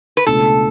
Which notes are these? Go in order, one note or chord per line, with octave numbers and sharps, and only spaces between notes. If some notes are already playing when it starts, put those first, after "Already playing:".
B4
C#2 B2 A3 D4 A4